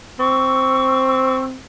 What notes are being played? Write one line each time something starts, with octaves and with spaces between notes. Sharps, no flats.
C4 C#6 E6